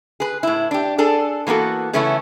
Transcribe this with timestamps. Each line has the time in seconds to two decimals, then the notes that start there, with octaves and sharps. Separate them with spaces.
0.20 G#4 B4
0.43 A2 E4
0.71 D4 G4
0.98 D4 G#4 A4
1.47 E3 A#3 B3 F#4 A4
1.93 C#3 E3 A3 B3 C#4 E4